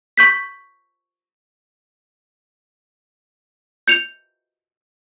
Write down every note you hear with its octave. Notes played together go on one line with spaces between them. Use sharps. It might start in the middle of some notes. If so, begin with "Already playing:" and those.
C#6 G6 B6
G6 C#7 F7